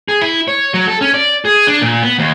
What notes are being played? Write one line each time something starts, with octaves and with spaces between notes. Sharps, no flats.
G#4
E4
C#5
F#3
A4
C#4
D5
G#4
D4
A#2
B3
D#2